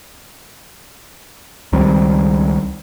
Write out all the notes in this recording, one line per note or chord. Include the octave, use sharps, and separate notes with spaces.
C#2 D#3 G3 C4